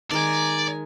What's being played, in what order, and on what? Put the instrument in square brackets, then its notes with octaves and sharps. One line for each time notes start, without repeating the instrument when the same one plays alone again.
[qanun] D#3 G#3 [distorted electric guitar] D5 [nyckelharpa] G#5 A#5